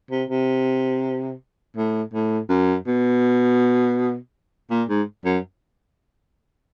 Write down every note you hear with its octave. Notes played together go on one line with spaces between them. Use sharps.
C3
C3
A2
A2
F#2
B2
A#2
G#2
F#2